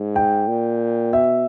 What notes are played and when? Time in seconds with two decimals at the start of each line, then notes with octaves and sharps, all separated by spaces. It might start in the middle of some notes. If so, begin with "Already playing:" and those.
Already playing: G#2
0.16 G5
0.48 A#2
1.13 B2 E5